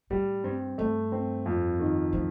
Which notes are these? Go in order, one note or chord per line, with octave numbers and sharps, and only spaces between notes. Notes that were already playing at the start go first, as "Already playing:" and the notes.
A2 G3
G2 C4
G2 A3
C4
F2
D#3
A2 F3